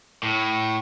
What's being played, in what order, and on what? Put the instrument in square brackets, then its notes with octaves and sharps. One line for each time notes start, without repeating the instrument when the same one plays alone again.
[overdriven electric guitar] A2